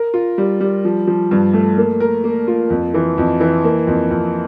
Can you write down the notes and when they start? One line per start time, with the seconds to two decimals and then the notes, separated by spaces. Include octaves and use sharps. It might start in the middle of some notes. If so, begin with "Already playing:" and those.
Already playing: A#4
0.14 F4
0.38 G3
0.60 G3
0.85 F3
1.07 F3
1.31 G2
1.54 A3
1.78 A#3
2.00 A#4
2.24 A#3
2.48 F4
2.70 F2
2.94 E3
3.18 F2
3.40 E3
3.64 A#3
3.87 F2
4.11 F2